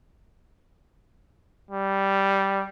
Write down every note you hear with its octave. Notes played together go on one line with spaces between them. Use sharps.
G3